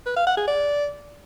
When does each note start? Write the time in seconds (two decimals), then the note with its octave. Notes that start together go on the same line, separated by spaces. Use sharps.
0.06 B4
0.16 F5
0.27 F#5
0.37 G#4
0.48 D5